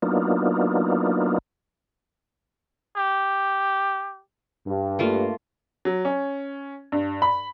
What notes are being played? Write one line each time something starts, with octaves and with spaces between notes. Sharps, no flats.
F#3 A#3 B3 D4 D#4 F4
G4
G2
A3 A#3 F4
F#3
C#4
G2
B5